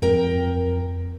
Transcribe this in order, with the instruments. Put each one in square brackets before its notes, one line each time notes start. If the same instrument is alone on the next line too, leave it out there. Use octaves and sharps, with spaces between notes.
[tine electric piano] F2 [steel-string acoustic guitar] A#4 G5